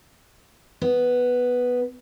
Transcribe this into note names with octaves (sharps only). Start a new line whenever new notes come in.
B3